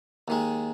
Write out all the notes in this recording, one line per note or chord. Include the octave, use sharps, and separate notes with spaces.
D#2 D#3 G#3